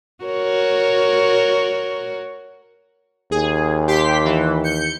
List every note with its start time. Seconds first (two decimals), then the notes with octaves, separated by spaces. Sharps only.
0.24 F#4 A#4 C#5
3.31 D#2 G#4
3.88 G4 C6 B6
4.25 E3
4.64 G6 C#7